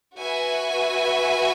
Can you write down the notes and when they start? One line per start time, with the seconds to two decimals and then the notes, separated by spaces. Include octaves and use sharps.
0.19 F#4 B4 E5 G#5